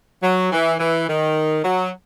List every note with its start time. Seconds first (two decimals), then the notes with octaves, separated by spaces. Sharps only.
0.22 F#3
0.51 E3
0.80 E3
1.08 D#3
1.64 F#3